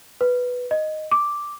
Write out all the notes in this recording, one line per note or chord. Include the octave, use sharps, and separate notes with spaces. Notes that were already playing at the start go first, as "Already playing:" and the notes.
B4
D#5
D6